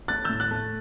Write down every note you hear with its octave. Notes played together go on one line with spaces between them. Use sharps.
A3 F#6 A6
A2 E6 G6
F#6 A6
A3